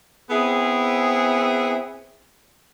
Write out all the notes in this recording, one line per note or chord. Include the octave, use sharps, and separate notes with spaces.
B3 C4 E4 G#4